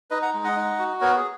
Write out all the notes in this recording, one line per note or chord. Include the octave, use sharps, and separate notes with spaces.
D#4 B4 D#5
F#5 A#5
G#3
D#5 F#5
D#4
F#4
B3 A#4 C#5
G#4